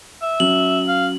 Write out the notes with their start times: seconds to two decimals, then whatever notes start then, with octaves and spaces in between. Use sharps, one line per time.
0.22 E5
0.40 F#3 C#4 F#7
0.88 F5